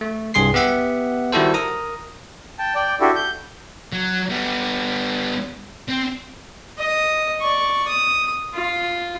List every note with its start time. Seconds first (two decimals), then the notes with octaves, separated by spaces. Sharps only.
0.01 A3
0.34 C2 G2 G#4 C6 C7
0.54 B3 G4 E5 F#5
1.32 D#3 G3 E4 F#4 A4 C5
1.54 A#4 A#5 D#6
2.58 G5 A5
2.75 D5 G5
3.00 D4 E4 F#4 G4 A4
3.15 G6
3.92 F#3
4.30 G3 B3
5.89 C4
6.78 D#5
7.41 D5 C#6
7.88 D#6
8.54 F4